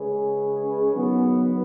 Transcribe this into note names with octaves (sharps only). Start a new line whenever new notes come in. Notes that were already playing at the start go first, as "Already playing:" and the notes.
Already playing: C#3 G#3 C#4 G#4 B4
D#3 F#3 B3